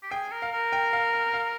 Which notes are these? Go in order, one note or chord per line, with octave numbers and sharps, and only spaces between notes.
G4
G#4 G5
A#4
F5
A#4
G5
F5
F5
F5